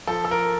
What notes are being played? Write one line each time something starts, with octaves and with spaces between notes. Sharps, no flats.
F3 A4
A4
A#4